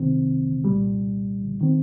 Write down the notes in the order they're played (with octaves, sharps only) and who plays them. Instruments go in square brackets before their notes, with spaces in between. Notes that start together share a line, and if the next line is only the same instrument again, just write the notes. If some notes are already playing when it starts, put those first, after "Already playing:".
Already playing: [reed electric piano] C2 C3 D#3 C4
C2 A#2 G3
D#3 C4